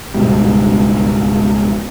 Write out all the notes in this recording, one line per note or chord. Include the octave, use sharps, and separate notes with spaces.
C#2 G#2 B2 G3